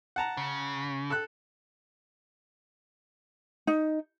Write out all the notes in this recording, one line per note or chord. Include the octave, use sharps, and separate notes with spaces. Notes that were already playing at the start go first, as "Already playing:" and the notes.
F#5 A5 A#5
C#3
A4 E6 F#6
D#4